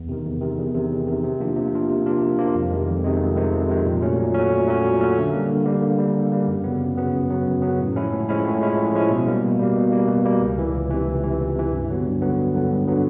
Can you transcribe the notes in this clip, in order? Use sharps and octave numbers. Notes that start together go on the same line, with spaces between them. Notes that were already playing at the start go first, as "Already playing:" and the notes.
Already playing: E2
C3 D#3
E2
C3 D#3
E2
C3 D#3
E2
C3 D#3
C3
F3 A#3 D4 F4
C3
F3 A#3 D4 F4
C3
F3 A#3 D4 F4
C3
F3 A#3 D4 F4
F2
C3 D#3 G#3
F2
C3 D#3 G#3
F2
C3 D#3 G#3
F2
C3 D#3 G#3
A#2
F#3 A3 C#4
A#2
F#3 A3 C#4
A#2
F#3 A3 C#4
A#2
F#3 A3 C#4
D3
G3 A#3
D3
G3 A#3
D3
G3 A#3
D3
G3 A#3
F#2
C#3 F#3 B3
F#2
C#3 F#3 B3
F#2
C#3 F#3 B3
F#2
C#3 F#3 B3
A2
F3 G#3 C#4 E4
A2
F3 G#3 C#4 E4
A2
F3 G#3 C#4 E4
A2
F3 G#3 C#4 E4
B2
G3 A#3
B2
G3 A#3
B2
G3 A#3
B2
G3 A#3
C#2
C3 E3
C#2
C3 E3
C#2
C3 E3
C#2
C3 E3
G2
D3 F#3 B3
G2
D3 F#3 B3
G2
D3 F#3 B3
G2
D3 F#3 B3